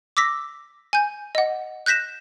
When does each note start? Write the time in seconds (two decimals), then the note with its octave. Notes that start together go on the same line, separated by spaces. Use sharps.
0.17 D6 E6 A#6 B6
0.93 G#5 G6
1.35 D#5 F#5
1.86 F#6 G6 A#6 B6 E7